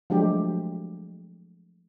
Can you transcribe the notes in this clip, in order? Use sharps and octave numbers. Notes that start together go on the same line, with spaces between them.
F3 F#3 G#3 A3 D4 G4